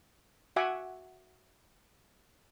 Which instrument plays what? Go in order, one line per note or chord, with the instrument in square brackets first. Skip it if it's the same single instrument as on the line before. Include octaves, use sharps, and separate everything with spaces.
[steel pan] F#4 E5 F#5 G#5 D6